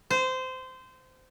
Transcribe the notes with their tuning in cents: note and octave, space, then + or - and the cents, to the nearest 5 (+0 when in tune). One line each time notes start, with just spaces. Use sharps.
C5 -20